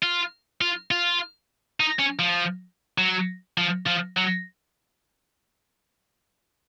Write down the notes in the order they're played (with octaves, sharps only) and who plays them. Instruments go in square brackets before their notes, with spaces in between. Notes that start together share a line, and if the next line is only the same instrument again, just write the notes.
[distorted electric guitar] F4
F4
F4
D#4
C#4
F3
F#3
F3
F3
F#3